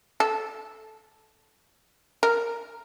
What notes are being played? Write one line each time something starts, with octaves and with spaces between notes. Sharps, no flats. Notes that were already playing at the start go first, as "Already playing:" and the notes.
A4
A#4